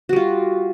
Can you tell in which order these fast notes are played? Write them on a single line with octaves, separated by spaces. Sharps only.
F#4 G3 F4